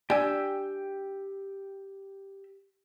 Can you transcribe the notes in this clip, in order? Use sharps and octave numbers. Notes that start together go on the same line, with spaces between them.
D4 G4 G5 G#5 E6